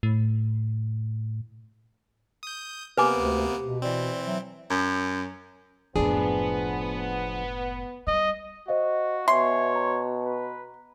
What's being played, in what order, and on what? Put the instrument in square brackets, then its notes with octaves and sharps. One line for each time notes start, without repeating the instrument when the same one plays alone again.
[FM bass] A2
[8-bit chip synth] D#6 G6
[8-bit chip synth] C3 A#3 B3 [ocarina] G4 [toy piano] B4 G#5 D6
[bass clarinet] D2
B2
[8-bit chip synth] E3 C4 [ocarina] D5
[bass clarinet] F#3 [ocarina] E5
[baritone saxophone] F#2
[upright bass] F#1 A2 [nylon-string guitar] F3 D4 G#4 [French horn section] B3
[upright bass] G3 [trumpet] D#5
[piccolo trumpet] F#4 [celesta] C5 D#5 F5
[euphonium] B2 [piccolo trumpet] C#5 [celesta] E5 G#5 [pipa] C6
[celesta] A#5
[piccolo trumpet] B4